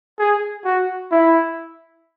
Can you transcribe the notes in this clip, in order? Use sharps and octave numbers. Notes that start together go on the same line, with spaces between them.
G#4
F#4
E4